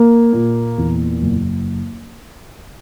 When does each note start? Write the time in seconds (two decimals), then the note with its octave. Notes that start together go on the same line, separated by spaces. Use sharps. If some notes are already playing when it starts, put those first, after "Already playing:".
Already playing: A#3
0.33 A#2
0.78 E2
1.22 F#1